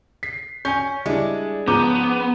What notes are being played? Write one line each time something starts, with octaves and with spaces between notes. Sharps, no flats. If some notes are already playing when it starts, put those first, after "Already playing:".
B6 C7
C#4 G#5 G6
G3 G#3 D4 E4
G#2 F3 B3 C#4 A#5 D6 G6